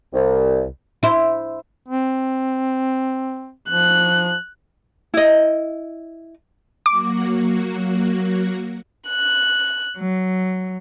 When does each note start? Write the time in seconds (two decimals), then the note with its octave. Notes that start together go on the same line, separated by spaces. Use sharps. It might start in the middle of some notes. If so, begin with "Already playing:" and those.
0.13 C2
1.03 E4 C5
1.88 C4
3.69 F3 F#6
5.14 E4 D#5
6.86 F#3 A#3 F#4 D6
9.08 F#6
9.97 F#3